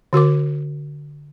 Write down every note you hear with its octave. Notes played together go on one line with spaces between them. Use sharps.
D3 F#4 A#4 D6